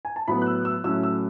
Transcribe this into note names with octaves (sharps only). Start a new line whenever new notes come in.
G#5
A5
A2 F#3 B3 B5
F#6
E6
E6
A2 F#3 A3 C#4 E6
E6